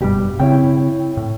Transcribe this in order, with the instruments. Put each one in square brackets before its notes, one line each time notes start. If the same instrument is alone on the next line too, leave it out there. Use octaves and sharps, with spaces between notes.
[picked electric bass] F#1 G2 G3 [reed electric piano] B2 G4
[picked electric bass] C#3 C4 [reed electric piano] E4 C#5 G5
[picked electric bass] A2